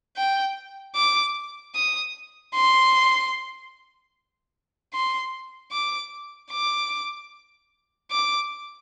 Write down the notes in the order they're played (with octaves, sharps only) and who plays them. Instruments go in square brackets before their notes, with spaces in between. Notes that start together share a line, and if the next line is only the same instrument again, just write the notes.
[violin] G5
D6
D#6
C6
C6
D6
D6
D6